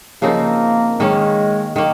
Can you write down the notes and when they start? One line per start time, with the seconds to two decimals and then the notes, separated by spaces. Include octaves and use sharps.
0.22 C#3 F3 A#3 C4 D#4
1.00 D#3 G#3 A#3 C#4
1.76 D#3 A#3